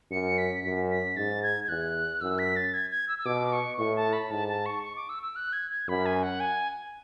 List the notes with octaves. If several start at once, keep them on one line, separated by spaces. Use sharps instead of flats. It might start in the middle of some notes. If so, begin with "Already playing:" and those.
F#2 C#7
B6
F#2 B6
B6
G#2 A6
G#6
G#6
E2 F#6
F#2 E6
B6
A6
G#6
G#6
E6
E6
B2 D6
C#6
A2 C#6
A5
B5
G#2 A5
A5
C#6
C#6
D6
E6
E6
F#6
G#6
G#6
F#2 B5
G#5
F#5
G#5